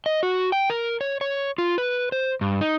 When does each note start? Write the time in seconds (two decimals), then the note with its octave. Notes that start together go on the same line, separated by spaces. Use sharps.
0.06 D#5
0.23 F#4
0.52 G5
0.70 A#4
1.01 C#5
1.21 C#5
1.58 F4
1.78 B4
2.12 C5
2.41 G2
2.61 D#4